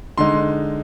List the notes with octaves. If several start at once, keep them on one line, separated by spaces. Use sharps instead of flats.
D3 G#3 D#4 C6